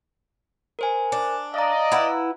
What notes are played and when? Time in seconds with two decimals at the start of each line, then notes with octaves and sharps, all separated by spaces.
0.79 A#4 C5 G#5
1.12 D4
1.54 D5 D#5 F5 A#5
1.92 E4 B4 F#5